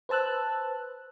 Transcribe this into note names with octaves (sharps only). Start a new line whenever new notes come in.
B4 C5 A5 E6 F#6